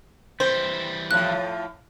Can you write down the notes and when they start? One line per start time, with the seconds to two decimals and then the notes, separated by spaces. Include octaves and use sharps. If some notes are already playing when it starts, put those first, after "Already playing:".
0.40 E3 G3 C4 C5
1.11 A2 F3 F#6